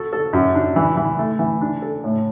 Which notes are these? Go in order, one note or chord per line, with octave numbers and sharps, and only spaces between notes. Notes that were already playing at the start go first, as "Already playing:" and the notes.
Already playing: F#4 A4
A4
F#2
D4
E3
E3
A3
E3
D4
A4
A2